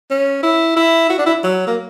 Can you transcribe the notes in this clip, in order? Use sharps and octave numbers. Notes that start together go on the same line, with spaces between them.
C#4
E4
E4
F#4
D4
E4
F#3
A#3